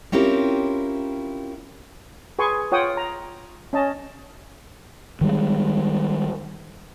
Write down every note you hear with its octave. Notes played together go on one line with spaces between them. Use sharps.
C4 C#4 E4 F4 G4 A#4
G#4 B4 G#5 C6 C#6
F4 C#5 F#5 G5 D#6
A#5
C#4 D#5 A5
D#3 G3 G#3